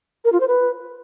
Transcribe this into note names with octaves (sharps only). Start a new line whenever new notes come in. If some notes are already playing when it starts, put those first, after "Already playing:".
A#4
F4
C5
B4